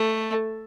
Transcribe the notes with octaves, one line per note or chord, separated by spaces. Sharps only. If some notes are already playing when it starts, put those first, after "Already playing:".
Already playing: A3